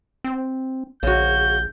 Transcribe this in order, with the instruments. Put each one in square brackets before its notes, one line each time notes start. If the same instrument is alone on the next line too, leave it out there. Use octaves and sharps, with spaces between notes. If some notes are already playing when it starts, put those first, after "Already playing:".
[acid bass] C4
[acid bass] A#1 [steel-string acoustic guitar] C#3 F#4 [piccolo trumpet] G6